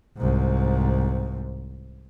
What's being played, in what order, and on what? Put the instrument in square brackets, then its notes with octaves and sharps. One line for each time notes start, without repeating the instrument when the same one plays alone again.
[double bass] C2 G#2